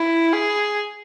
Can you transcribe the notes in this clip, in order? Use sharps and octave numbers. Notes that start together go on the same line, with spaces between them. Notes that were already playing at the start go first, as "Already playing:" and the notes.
Already playing: E4
G#4